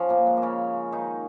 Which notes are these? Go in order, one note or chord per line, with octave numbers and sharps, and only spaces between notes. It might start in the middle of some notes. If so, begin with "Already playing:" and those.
Already playing: F3 C#4
A#2 A#3
G#3
A#3
C#3 C#4
D#3 D#4